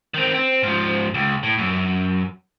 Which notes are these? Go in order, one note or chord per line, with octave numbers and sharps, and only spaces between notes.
D#3 C4
C4
G#2 F3
C#2
A2
F#2